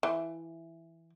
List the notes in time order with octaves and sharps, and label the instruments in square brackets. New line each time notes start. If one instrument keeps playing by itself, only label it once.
[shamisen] E3